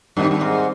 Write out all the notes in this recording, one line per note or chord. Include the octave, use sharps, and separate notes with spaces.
G2 D#3 G3 C4 D#4 G4
G2
G#2